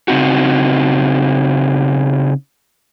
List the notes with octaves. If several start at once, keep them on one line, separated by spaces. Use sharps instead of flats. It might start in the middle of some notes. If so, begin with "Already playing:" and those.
C#3 C4 D#4 F#4